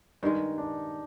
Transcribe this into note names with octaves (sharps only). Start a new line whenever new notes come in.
G2 D#3 G#3 D#4
D4